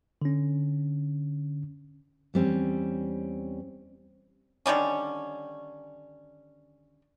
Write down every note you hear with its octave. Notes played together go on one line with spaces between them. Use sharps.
D3 C#4
E2 G3 C4 C#4
D3 D#3 G3 C#4